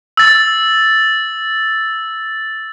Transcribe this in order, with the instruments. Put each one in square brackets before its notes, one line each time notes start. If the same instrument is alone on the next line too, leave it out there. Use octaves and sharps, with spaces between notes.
[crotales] E6 A6